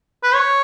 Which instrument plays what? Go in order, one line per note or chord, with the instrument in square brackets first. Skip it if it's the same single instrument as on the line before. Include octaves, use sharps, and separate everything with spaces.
[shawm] B4
C#5